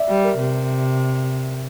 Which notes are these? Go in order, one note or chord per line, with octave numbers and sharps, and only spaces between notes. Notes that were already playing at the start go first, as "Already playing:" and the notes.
Already playing: D5 E5
G3
A#4
C3